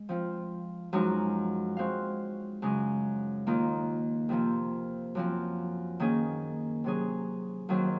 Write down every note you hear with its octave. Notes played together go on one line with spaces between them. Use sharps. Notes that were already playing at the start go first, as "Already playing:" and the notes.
Already playing: G#3
F3 C4 F4
F#2 F3 G#3 D#4 F#4
G#3 C4 F#4 C5 F5
F#2 C#3 G#3
D#2 D#3 A#3 F4
F2 C3 F3 A#3
F#2 F3 C4
D#3 A#3 C#4 G#4
C3 F#3 C#4 G#4
D#2 D#3 F#3 C4